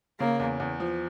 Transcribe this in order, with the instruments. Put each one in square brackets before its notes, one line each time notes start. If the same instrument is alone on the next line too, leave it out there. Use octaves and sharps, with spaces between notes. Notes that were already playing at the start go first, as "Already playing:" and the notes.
[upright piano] C#3 [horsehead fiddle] A#3
[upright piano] E2
E2
F3